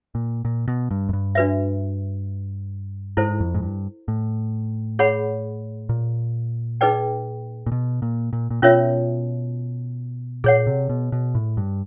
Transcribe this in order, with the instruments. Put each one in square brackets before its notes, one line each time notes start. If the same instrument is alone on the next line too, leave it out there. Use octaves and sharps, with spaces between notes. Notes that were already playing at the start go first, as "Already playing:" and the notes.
[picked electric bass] A#2
A#2
B2
G2
F#2
G2
[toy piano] D4 F#4 B4 E5
[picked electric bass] G#2 [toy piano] E4 A4 C5
[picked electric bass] F2
G#2
G2
A2
[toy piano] G#4 C#5 F#5 B5
[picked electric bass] A#2
[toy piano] D#4 G#4 B4 D5 G5
[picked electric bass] A#2
B2
A#2
A#2
A#2
[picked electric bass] B2 [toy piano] C#4 F4 A#4 C#5 E5
[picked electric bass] A#2 [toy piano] G#4 C#5 F#5
[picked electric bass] C3
B2
B2
A2
G2